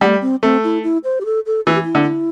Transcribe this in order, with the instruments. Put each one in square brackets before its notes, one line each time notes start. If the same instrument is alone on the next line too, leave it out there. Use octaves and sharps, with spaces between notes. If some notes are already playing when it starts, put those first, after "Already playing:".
[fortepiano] G3 [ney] A3
[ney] C4
[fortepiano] A3 [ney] C4
[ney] E4
E4
C5
G4
A4
A4
[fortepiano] E3 [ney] E4
[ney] G4
E4
[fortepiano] D3